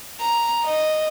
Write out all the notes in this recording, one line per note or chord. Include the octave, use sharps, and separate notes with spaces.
A#5
D#5